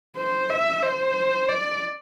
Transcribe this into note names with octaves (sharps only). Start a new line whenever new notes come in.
C5
E5
C5
D5